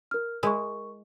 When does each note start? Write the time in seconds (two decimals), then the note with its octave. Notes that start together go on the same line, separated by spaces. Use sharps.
0.11 A#4 F6
0.43 G#3 E4 A#4 C#6